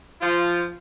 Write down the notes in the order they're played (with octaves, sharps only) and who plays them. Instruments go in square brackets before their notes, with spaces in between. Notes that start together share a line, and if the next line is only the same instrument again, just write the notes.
[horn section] F3 F4